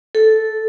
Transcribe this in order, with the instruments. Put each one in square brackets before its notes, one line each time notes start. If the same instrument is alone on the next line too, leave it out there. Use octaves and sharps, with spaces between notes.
[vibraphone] A4